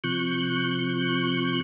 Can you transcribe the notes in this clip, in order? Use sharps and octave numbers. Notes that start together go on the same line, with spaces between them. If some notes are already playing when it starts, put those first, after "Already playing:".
C3 F3 C#6 F#6 G6